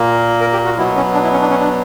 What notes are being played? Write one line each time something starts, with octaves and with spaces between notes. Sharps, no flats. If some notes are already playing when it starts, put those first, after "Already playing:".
Already playing: A#2 A#3
A#4
G4
F#4
B2 F#3 B3 E4
C#4
D4
E4
C#4
D4
C#4
D4